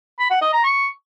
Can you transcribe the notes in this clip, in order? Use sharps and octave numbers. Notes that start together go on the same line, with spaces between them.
B5
F#5
D#5
A#5
C#6